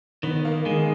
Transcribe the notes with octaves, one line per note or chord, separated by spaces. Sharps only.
D#3 B3
A#3
D#3 G#3